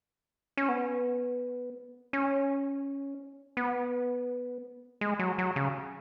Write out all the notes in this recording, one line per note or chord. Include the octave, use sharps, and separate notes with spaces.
C#4
B3
C#4
B3
G#3
F#3
F#3
C#3